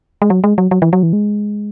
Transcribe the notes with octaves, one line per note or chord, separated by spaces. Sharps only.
G#3
F#3
G#3
F#3
F#3
E3
F#3
E3
G#3